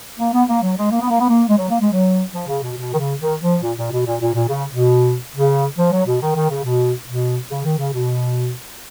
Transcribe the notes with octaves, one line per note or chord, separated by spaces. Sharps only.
A#3
B3
A#3
F#3
G#3
A#3
B3
A#3
B3
A#3
G#3
F#3
A#3
G#3
F#3
F3
C#3
B2
B2
D#3
C#3
D#3
F3
A#2
A#2
B2
A#2
A#2
A#2
C#3
B2
C#3
F3
F#3
B2
D#3
D#3
C#3
B2
B2
C#3
D#3
C#3
B2